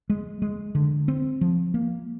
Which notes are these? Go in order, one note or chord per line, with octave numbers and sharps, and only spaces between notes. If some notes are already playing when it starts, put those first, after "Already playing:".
G#3
G#3
D3
C4
F3
A#3